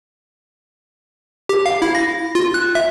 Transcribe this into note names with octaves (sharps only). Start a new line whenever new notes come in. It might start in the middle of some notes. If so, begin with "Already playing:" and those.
G4
F5
E4
A#6
F4
F#6
E5